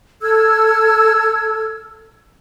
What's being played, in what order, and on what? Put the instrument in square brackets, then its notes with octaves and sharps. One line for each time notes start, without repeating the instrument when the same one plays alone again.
[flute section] A4 E6 F6 G#6